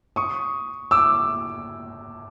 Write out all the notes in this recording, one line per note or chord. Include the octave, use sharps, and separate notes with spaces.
C#6 D#6
D6 E6